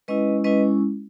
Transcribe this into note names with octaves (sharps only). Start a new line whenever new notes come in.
G#3 C#4 E4 B4 D#5
G#3 C#4 E4 B4 D#5